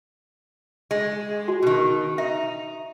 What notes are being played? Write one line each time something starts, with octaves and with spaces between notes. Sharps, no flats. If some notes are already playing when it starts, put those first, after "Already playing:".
G#3
F#4
B2 D#3
D#4 E5